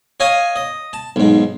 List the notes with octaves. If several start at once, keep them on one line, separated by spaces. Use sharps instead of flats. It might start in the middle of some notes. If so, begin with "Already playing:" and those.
C#5 D#5 F5 G#5 D#6
D#5
A5
B1 G#2